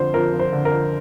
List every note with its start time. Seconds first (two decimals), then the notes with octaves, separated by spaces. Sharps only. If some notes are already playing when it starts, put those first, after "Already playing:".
Already playing: F2 D3 F3 C5
0.14 F2 A#4
0.33 F3
0.39 C5
0.52 D3
0.65 A#4
0.71 F2